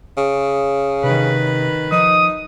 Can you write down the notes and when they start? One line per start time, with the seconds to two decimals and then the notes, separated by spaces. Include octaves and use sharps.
0.17 C#3
1.03 C3 D#3 B4
1.92 F3 D#4 D#6